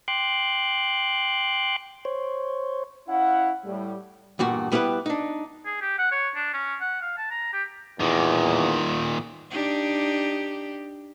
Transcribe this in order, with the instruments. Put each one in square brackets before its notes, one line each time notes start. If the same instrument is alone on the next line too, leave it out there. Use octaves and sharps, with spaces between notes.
[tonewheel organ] G5 C6 D6 F#6
C5 C#5
[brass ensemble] C#4 E4 F5 F#5
A2 G3
[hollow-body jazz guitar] E2 G2 A#2 F#4
G3 B3 E4 G4 B4
D4 D#4
[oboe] G#4
G4
F#5
C#5
D4
C#4
F#5
F5
A5
A#5
G4
[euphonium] E2 [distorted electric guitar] A#2 D#3
[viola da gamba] D4 D#4 G4